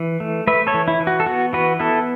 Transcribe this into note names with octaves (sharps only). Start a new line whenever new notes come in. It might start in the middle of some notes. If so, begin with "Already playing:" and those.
Already playing: E3
A3
A3 B4 E5
A4 C#5
E3
E4
E3
F#4
A4
B3 F#4
E3 F#4 B4
B3 E4 A4